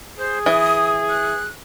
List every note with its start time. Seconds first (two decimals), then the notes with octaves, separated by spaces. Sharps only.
0.18 G#4 C5
0.46 E3 D#6
1.09 F#6